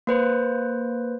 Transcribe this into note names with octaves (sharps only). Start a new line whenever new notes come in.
A#3 B4 C5